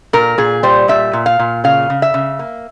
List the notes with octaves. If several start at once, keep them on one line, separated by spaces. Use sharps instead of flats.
A#2 A#4
A#2 G#4
G3 C5
A#2 E5
A#2
F5
A#2
C#3 F5
C#3
E5
C#3
A#3